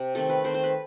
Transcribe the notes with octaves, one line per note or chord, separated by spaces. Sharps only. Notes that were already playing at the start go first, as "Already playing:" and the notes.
Already playing: C3
D#3 A3 C4 A4
B4
D#3 A3 C4 C5
C5
B4